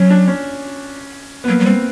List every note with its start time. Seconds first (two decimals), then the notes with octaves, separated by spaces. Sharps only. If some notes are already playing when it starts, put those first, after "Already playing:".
Already playing: F#3 C#4
0.10 D4
0.28 C#4
1.44 B3
1.48 F#3 A#3
1.60 F#3
1.65 G3 C4